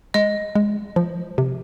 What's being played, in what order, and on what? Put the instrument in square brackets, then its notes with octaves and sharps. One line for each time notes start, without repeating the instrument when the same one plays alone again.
[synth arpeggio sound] G#3 [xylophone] D#5
[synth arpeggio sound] G#3
F3
C3